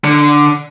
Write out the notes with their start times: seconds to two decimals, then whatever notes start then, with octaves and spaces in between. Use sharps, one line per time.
0.04 D3